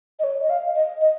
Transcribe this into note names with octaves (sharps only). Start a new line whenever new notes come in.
D#5
C#5
D#5
F5
D#5
D#5